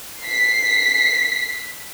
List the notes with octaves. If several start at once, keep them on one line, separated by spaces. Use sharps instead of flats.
B6 C7